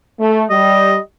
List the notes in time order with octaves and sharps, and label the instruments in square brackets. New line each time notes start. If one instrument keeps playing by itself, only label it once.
[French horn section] A3
[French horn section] G3 [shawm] D#5